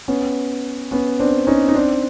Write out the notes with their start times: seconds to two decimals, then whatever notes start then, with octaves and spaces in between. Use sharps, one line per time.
0.08 B3 C#4
0.91 B3 C#4
1.20 C4 D4
1.47 C#4 D#4
1.68 D#4
1.74 C4 D4